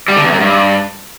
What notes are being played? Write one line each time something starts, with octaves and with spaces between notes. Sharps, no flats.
G3
D3
E2
F#2
G2